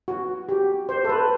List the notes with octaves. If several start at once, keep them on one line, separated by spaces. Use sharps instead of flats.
F#4
G4
C5
A4
B4